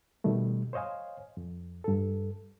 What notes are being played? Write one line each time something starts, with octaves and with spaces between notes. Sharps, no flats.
B2 D#3 G3 A3
C5 C#5 D#5 F5 G#5
F2
G2 A4